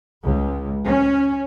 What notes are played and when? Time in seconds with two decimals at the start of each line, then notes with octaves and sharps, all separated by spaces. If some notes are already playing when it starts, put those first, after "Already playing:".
0.24 C#2
0.86 C#4